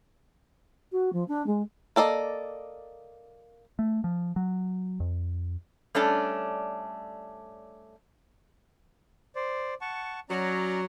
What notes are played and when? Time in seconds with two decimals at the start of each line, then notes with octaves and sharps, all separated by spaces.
0.92 F#4
1.13 F3
1.28 D4
1.47 G#3
1.96 A#3 A4 D5 D#5
3.79 A3
4.04 F3
4.36 F#3
5.00 F2
5.95 G3 A3 C#4 D4 A4 D5
9.35 C5 D5
9.81 F#5 A5 C#6
10.29 F#3 C#4 D5 A#5